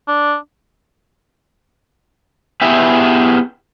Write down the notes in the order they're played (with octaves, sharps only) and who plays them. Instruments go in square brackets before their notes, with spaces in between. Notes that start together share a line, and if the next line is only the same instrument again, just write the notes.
[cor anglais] D4
[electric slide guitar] B3 E4 G4 G#4 B4 E5